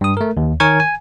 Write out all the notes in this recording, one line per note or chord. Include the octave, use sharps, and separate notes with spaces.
G2 D#6
A3 A#4
D#2
D#3 A#4 C#5 G#5 C#6 G#6
G#5